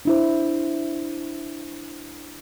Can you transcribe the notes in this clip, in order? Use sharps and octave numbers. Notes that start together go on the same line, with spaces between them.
D4 E4 C5